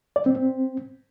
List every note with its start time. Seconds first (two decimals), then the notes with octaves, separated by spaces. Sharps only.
0.16 D5
0.26 C4
0.36 C4